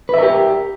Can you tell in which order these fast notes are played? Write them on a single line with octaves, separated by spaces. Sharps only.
B4 E5 A#4 G4